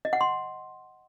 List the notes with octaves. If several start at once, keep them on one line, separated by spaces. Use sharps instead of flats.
D#5
F#5
C6